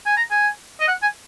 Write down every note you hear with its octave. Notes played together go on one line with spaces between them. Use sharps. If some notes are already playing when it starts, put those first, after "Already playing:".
G#5
A#5
G#5
D#5
F#5
G#5